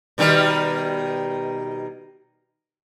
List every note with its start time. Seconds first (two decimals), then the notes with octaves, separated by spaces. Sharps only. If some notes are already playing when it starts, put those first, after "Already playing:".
0.18 B2 D#3 G3